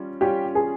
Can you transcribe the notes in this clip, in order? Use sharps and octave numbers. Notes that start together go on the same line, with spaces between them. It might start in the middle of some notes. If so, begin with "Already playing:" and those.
Already playing: G3 C#4 F4
G3 C#4 F4 G4
G#4